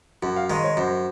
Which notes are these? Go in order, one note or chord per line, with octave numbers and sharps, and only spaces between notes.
F#2 F#4
F5
D#3 G#3 D#5
C#5
F#2 C5